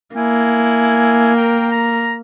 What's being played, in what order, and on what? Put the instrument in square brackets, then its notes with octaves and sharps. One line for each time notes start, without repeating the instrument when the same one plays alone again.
[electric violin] A#3 [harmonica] E4 G#5
[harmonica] A#4 G5
A#5